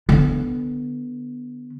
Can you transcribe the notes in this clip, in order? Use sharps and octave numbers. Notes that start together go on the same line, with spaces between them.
D3 B3